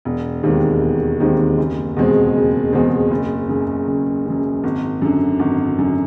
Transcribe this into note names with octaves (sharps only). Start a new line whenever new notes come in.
E1
D#2 D#3 G#3 C4
E1
D#2 D#3 G#3 C4
F#1
E2 B2 G#3 C4
F#1
E2 B2 G#3 C4
F#1
F#2 C#3
F#1
F#2 C#3
G#1
F#2 D3
G#1
F#2 D3